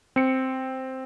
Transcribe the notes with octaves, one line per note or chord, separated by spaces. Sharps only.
C4 C#7